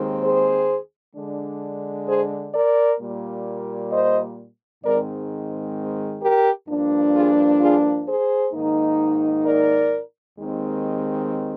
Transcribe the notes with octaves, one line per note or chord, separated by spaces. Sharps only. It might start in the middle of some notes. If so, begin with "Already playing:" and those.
Already playing: D#2 D#3 G#3 C4
G#4 C5
D3 G#3 D4
G#4 C5
A#4 D5
A#2 G3 A#3
C5 D#5
G#2 D#3 G#3 C4 A#4 D5
G4 A#4
G2 F3 A#3 D4
F4 G#4
F4 G#4
G#4 C5
G#2 D#3 A#3 D#4
A#4 D5
D#2 D#3 G#3 C4